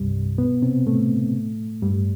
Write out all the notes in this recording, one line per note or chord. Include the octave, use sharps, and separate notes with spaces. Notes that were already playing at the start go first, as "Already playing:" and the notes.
Already playing: C2 G2 C3 G3
B2 B3
C3 C4
A2 A3
G2 G3